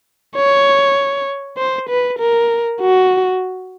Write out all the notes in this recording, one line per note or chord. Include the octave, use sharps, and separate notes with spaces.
C#5
C5
B4
A#4
F#4